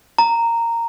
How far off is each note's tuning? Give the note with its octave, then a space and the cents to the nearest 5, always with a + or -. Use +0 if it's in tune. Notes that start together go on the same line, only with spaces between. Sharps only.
A#5 -10